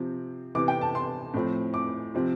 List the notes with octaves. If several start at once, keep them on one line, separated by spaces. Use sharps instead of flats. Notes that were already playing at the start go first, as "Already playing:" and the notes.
Already playing: C3 F3 C4
C3 E3 B3 D6
G5
A5
C6
A2 F3 C4
D6
C3 F3 C4